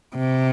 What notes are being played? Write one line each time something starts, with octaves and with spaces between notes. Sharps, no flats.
C3